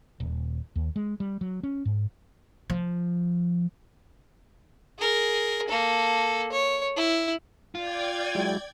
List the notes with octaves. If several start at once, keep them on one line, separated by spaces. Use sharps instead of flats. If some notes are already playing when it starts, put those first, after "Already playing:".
D#1
D#2
G#3
G3
F#3
C#4
G#2
F3
G#4 A#4
A#3 A4
C#5
E4
F4 D5 G5 G#6
F#3 G#3 E4